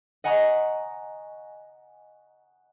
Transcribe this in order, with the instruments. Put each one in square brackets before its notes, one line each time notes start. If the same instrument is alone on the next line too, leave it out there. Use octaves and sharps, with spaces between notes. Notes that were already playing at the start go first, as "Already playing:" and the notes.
[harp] D#5 F#5 G#5 A#5 C#6 D#6